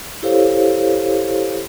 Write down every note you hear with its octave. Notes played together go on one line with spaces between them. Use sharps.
E4 G4 A4 C5 C#5 F5